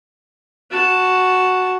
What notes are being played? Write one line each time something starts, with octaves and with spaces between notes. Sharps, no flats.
F#4 A5